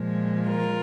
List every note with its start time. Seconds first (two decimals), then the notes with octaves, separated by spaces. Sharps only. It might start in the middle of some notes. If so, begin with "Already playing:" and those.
Already playing: A#2 F3 G#3
0.47 F4 A#4